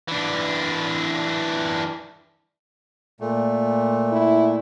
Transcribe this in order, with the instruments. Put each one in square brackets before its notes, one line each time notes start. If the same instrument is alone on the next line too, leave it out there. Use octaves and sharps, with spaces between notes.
[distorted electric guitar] E3 D4
[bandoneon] A#2 A3
[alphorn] E4